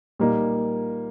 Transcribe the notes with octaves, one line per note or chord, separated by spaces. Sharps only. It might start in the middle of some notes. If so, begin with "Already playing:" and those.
A#2 G3 A#3 D#4